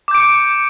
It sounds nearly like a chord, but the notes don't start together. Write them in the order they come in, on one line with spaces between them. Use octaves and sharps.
D6 G6 D7 C#7